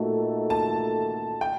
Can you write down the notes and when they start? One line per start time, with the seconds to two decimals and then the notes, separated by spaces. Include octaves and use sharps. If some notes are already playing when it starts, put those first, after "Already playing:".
Already playing: A#2 A3 D#4 F#4 A4
0.50 A5
1.41 G5